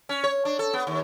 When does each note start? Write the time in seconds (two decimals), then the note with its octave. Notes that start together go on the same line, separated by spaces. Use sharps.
0.09 C#4
0.24 C#5
0.45 D4
0.59 A4
0.73 B3
0.87 D#2